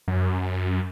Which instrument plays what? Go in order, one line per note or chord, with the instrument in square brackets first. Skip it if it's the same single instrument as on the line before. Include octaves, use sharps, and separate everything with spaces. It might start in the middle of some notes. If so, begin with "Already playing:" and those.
[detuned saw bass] F#2